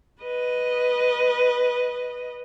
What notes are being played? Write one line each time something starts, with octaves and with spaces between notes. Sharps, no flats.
B4 D#5